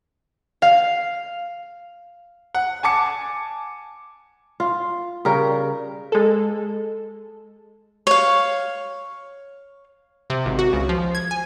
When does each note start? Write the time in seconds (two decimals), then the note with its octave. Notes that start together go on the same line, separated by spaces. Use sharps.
0.62 F5
2.55 F#5
2.83 G#5 A5 D6 C#7
4.60 F4
5.25 C#3 G3 A#4
6.12 G#3 A4
8.07 C#5 F5
10.30 C3
10.46 G#1
10.59 F#4
10.73 C#2
10.89 F3
11.15 G#6
11.31 G#5